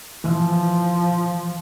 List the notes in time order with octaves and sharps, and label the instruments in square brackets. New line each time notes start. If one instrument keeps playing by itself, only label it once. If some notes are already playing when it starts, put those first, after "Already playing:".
[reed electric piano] E3 [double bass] F3